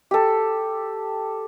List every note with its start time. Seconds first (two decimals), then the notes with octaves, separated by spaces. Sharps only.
0.11 G4 A4